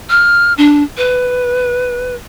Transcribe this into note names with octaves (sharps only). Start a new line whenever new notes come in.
F6
D4
B4